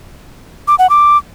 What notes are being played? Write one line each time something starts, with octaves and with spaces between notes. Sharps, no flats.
D6
F#5
D6